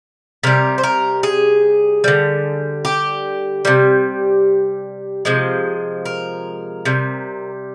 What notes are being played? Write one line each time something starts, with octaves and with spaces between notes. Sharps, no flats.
C3 G3 A#4
C5
A#4
G#4
D3 G3
G4
C3 G3
C3 F3 G#3
A#4
C3 G3